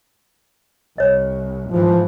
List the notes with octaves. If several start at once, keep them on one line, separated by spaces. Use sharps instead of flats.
C2 C#5 D#5
G#2 E3 F3